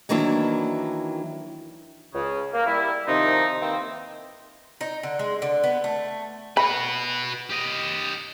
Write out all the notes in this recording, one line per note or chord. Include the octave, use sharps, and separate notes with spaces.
D#3 E3 F#3 A#3 D4 E4
C#2 C#3
A#3
G3 E4
C3 D#3 F3 C4 D#4
D#3 E3 A#3 C4
D#4
D3
G#3
D3
B3
A3
F#4 B4 B5
G4 D#5